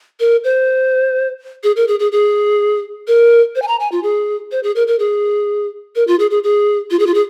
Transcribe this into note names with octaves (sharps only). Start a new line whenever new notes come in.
A#4
C5
G#4
A#4
G#4
G#4
G#4
A#4
C5
G#5
A#5
G#5
F4
G#4
C5
G#4
A#4
A#4
G#4
A#4
F4
G#4
G#4
G#4
F4
G#4
F4
G#4